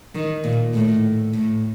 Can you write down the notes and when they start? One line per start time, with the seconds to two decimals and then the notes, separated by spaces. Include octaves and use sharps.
0.15 D#3
0.44 A#2
0.74 A2
1.33 A2